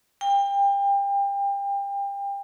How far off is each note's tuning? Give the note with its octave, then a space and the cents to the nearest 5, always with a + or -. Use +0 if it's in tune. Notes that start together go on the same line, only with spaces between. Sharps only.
G5 +30